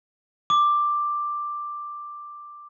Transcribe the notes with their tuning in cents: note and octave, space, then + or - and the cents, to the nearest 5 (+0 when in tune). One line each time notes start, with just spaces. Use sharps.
D6 +5